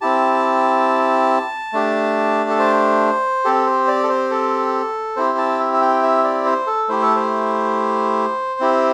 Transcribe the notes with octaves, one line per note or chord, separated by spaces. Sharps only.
C4 E4 G4 A5
A3 D4 G4
A4
C5
C4 G4 A4
C5
D5
A4
C5
A4
C4 E4 G4 C5
A5
E5
E5
G5
E5
D5
C5
A4
A3 E4 G4 C5
A4
C5
C4 E4 G4